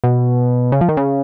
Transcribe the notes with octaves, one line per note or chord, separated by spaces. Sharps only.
B2
C#3
F3
D#3
C#3